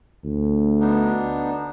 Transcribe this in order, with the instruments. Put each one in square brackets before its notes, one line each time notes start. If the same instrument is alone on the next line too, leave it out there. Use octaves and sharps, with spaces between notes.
[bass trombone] D2
[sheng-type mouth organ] B3 D4 D#4